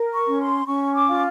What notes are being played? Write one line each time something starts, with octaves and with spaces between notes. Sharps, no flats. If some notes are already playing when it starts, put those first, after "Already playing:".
Already playing: A#4
C#6
C#4
C6
C#4 C#6
D6
F4